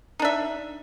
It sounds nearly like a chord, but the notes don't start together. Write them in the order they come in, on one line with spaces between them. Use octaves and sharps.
D#4 D4 E5